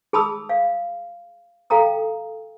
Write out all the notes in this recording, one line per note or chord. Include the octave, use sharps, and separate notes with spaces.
G#4 A5 B5 D#6 E6
F5
A4 F5 G5 A#5 D#6